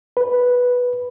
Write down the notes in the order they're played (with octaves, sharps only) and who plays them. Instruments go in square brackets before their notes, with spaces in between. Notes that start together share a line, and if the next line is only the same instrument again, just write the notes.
[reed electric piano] B4